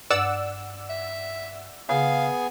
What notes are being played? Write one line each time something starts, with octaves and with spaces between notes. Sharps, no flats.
G2 D5 F#5 E6
E5
C#3 B3 G#4 F5 G#5